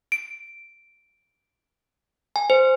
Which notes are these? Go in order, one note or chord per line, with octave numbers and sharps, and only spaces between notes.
D7
G#5
C5